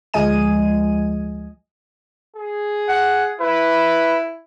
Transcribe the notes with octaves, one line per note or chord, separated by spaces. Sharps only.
D2 F3 G#3 D#5 G#5 D#7
G#4
F#5
E4 B4